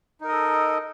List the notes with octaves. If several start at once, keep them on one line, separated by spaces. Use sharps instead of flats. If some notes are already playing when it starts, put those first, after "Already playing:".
D#4 A4 A#4 D#5